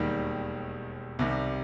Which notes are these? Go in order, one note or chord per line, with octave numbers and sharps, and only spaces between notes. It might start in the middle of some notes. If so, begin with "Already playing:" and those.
Already playing: E1 D#2 D#3 G3
C2 C3 D#3 G3